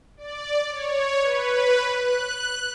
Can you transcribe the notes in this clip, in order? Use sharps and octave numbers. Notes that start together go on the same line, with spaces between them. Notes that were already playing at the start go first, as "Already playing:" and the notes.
D5
C#5
B4
F#6